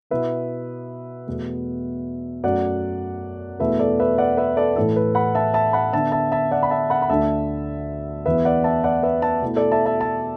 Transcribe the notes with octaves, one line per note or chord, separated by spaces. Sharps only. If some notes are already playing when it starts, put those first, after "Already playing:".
B2 B3 E4 B4 E5
E2 B2 A3
F#2 F#3 A3 D5 F#5
E2 B2 A3 E4 B4 E5
A4 D5
B4 E5
D5 F#5
B4 E5
A4 D5
A2 E3 A3 E4 A4
B4
F#5 B5
E5 A5
E5 A5
F#5 B5
D3 B3 D4 E5 A5
E5 A5
E5 A5
D5 F#5
B5
E5 A5
F#5 B5
B5
D2 D3 A3 D4 E5 A5
E2 E3 B3 B4 E5
D5 F#5
E5 A5
D5 F#5
B4 E5
E5 A5
B2 A3 E4
A4 D5
E5 A5
E5 A5
E5 A5